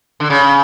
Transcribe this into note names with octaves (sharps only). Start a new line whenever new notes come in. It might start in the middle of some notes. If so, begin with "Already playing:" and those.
D3
C#3